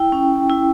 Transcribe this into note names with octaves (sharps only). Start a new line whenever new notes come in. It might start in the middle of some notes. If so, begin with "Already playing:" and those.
Already playing: E4 G5
C#4
E4